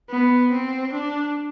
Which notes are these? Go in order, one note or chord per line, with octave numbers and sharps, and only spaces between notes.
B3
C4
D4